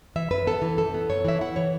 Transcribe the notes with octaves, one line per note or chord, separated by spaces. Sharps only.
E3 E5
F#2 B4
B3 A4
E3
F#2 A4
B3
F#2 C#5
E3 E5
E4 F#5
E3 C#5